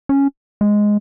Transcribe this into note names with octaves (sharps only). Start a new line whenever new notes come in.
C#4
G#3